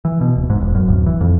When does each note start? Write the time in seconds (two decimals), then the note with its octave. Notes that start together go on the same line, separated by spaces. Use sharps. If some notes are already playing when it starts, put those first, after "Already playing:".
0.05 E3
0.21 B2
0.36 D1
0.50 G#2
0.61 E1
0.75 F#2
0.88 D1
1.06 E3
1.21 F2